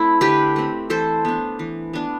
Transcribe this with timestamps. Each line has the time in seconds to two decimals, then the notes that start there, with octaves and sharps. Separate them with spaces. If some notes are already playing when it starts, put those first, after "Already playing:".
Already playing: A3 C4 E4
0.21 D3 G4 B4
0.56 A3 C4
0.90 E3 A4 C5
1.25 B3 D4
1.59 E3
1.93 B3 D4